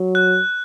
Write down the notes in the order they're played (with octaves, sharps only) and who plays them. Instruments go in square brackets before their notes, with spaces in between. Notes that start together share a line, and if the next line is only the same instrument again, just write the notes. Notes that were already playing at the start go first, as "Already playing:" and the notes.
Already playing: [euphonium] F#3
[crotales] F#6